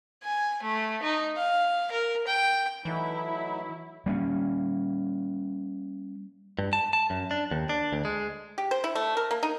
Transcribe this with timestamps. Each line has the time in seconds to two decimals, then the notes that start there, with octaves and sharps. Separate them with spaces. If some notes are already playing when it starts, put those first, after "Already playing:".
0.23 G#5
0.63 A3
1.03 D#4
1.37 F5
1.92 A#4
2.27 G5
2.85 E3 F#3 A3 D#4 E4
4.06 G3 A#3 C#4
6.59 G2
6.73 A5
6.93 A5
7.10 F#2
7.31 D4
7.51 D#2
7.69 D4
7.93 D2
8.05 G#3
8.58 G4
8.71 C5
8.84 E4
8.95 A3
9.17 A#4
9.31 A#3
9.43 D#4